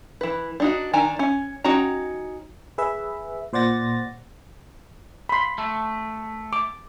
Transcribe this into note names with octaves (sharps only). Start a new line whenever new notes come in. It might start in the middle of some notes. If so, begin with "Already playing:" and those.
E3 B4
D4 D#4 F#4
D#3 D4 G#5 A#5
C#4 G#5
C#4 D#4 F#4 G5 A#5
G#4 B4 E5
A#2 C5 D5 F#5 A6 A#6
B5 C6
A3
D6